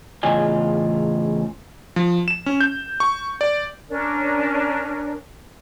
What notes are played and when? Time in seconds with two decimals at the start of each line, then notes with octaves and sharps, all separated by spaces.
0.23 E2 A2 C#3 F4 D#5 G#5
1.96 F3
2.28 E7
2.46 C#4
2.60 G6
3.00 C#6
3.41 D5
3.89 C#4 D4 A#4